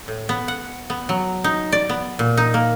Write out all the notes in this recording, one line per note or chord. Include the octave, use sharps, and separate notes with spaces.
A2
B3
F#5
B3
F#3
D#4
D5
B3
A#2
D#4
A#3